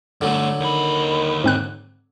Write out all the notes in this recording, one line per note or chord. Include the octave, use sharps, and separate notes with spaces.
G2 D3 F#3 A3
D#2 D#3 B5
G#2 C4 F#6